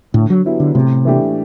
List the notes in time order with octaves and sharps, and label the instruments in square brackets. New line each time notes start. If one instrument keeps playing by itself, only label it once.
[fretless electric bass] A2 [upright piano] D3
[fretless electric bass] F#3
[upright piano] F#3 B3 E4 G4
[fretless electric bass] D3
[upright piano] A2 [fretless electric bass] C3
[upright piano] E3 A3 D4 G4